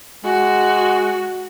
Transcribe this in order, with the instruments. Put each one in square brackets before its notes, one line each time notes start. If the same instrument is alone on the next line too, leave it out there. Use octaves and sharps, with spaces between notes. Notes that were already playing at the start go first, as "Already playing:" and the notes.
[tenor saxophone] G#3 [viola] F#4